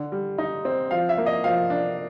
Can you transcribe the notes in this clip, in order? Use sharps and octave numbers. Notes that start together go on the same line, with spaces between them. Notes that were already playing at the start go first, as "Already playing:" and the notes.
Already playing: D3
G3
D#4
C4
F3 F5
E5
A#3
D#5
F3 F5
D4